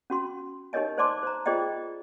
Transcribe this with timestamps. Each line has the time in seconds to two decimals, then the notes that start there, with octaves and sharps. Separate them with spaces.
0.10 C#4 F#4 C6
0.73 D#4 G4 A#4 C#5 D#5 G#5
0.98 C5 D5 G#5 A5 C6 D6
1.23 C5 A#5
1.46 F4 G#4 C5 D5 D#5 G5